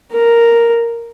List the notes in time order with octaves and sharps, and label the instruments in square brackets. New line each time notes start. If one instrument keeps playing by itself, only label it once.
[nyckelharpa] A#4